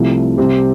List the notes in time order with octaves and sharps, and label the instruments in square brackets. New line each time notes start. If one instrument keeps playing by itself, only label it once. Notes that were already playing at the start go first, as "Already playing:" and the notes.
Already playing: [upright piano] C2 C3 F3 A3 E4
C2 C3 G3 C4 G4